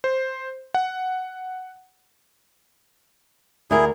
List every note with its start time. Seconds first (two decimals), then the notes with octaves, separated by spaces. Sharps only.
0.04 C5
0.74 F#5
3.71 D2 E4 G#4 A#4